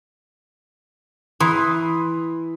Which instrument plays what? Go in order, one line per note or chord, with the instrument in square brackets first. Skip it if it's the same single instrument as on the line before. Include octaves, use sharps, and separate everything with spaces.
[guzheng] E3 [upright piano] B5 C6 D#6